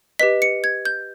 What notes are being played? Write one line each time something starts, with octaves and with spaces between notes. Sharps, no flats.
G4 B4 D#5 B6
C#7
G#6
G6